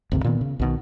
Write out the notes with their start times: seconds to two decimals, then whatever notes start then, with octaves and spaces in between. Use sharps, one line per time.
0.12 G#1 D2 C3
0.24 A#2 D#3 B3
0.41 C#3
0.60 B1 B2 D#3